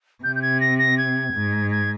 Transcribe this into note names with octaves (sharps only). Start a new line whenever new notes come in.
C3 G6
G6
G#6
A#6
A#6
G#6
G#2
G#6